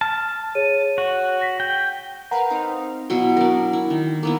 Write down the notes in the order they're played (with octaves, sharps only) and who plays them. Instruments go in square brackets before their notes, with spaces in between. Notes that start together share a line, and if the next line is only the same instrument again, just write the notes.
[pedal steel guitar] A5 [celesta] F6
[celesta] G#4 C#5 D#7
[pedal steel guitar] F#4
[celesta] A#6 B6
[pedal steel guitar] G5
[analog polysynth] A#4 B4 F5 [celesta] F#5 A#5
[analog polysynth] C4 D#4 F5
[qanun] B2 F#3 E4 C6
D4 A#4
E4
D#3
A#3 B3 E4